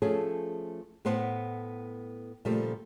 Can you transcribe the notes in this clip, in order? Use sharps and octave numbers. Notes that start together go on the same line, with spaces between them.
F3 A3 C#4 G#4 A4
A2 B3 C5 F#5
A#2 C#3 F3 G3 A3